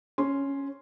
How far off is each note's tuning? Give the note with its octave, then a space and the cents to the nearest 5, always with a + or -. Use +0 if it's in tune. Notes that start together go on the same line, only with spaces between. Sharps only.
C#4 +0 C6 +0